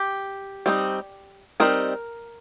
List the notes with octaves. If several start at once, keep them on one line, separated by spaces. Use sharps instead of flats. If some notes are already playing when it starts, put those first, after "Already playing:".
Already playing: G4
G3 C4 D#4
G3 C4 D#4 A#4